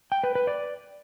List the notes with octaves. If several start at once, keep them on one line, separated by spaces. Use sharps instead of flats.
G5
B4
B4
D5